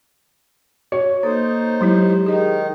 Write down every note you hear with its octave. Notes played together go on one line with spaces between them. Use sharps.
F#4 C#5
A#3 D#4 A4 C5 D#6
F#3 G#3 E4 G4
D#3 D#4 G#4 D#5